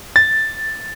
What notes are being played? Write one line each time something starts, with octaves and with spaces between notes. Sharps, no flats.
A6